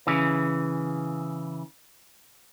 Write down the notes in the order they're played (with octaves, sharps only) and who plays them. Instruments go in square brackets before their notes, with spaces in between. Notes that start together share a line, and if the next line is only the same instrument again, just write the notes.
[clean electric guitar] C#3 E3